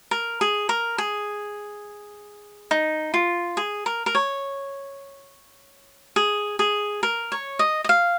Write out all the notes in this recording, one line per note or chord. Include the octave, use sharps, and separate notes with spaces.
A#4
G#4
A#4
G#4
D#4
F4
G#4
A#4
A#4
C#5
G#4
G#4
A#4
C#5
D#5
D#5
F5